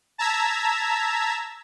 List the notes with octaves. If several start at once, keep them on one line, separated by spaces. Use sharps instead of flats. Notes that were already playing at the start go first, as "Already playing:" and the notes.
A5 A#5 E6 G#6 B6